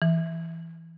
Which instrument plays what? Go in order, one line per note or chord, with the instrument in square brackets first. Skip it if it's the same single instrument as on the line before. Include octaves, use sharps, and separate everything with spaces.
[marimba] E3